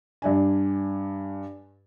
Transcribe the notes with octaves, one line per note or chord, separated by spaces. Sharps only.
G2 D4 G#5